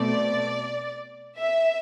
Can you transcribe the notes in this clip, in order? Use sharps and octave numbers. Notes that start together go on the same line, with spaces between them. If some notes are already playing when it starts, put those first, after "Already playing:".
Already playing: B2 A3 C4 D5
E5